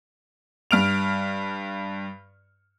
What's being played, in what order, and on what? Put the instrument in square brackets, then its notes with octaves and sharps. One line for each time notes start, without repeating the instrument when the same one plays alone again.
[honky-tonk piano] G2 F6 D7 F7